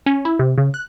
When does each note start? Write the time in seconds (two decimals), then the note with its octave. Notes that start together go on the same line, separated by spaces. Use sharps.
0.06 C#4
0.25 E4
0.39 C3
0.58 C#3
0.74 F#6